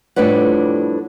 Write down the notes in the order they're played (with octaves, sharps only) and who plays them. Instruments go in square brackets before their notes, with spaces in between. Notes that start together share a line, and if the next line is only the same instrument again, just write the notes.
[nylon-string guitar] F2 A2 G3 D4 B4 F#5